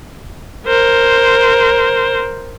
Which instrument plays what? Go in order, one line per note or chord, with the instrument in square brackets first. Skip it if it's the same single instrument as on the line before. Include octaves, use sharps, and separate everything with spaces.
[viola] A#4 C5